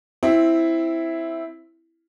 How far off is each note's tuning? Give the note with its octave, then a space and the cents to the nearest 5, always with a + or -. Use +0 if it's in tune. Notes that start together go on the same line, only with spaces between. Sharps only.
C4 +0 E4 +0